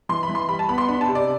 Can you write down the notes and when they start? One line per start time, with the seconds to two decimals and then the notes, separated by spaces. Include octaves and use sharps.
0.09 E3 C6
0.23 B5
0.29 E3
0.35 C6
0.49 G3 B5
0.59 A5
0.69 B3 B5
0.78 C6
0.88 D4 B5
1.01 A5
1.08 C3
1.15 D5